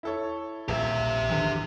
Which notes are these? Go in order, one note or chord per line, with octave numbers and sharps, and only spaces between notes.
E4 A4 C#5
D#1 A#1 A#3 G4 E5
G#1 E2 D3 E3 F3